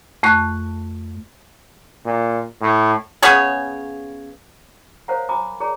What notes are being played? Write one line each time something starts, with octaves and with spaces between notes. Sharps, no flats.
F2 A3 C#6 F#6
A#2
A2
C#3 B3 G#4 C#5
A#4 C5 C#5 F5 F#5 A#5
G#5 A#5 B5 D6 D#6
G#4 A#4 C#5 D5 A#5